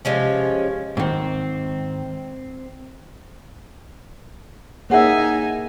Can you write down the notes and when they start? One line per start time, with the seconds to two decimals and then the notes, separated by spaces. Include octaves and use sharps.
0.05 C3 F3 G#3 C#4
0.97 G#2 D#3 C4
4.90 A#3 C#4 D#4 G#4 C#5 E5 F#5 G#5